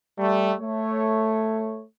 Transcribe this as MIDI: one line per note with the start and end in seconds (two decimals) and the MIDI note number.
0.19 0.54 55
0.19 0.54 57
0.60 1.84 57
0.60 1.84 73